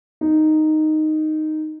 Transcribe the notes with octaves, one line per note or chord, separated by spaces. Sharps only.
D#4